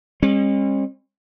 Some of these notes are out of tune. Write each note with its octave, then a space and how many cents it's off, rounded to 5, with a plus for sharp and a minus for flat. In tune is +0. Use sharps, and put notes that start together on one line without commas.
G#3 -45 C#4 -45